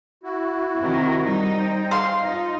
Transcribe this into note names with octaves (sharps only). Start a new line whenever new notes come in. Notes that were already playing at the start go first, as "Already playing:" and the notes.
E4 F#4
C3 D#3 A#4
G3 D#4
C5 G5
F5 C6
D#4 F4 A#5